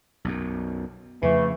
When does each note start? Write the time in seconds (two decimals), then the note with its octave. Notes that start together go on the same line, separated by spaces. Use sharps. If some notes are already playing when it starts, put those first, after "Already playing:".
0.25 B1 F#2
1.22 F2 C#3 E3 F3 A3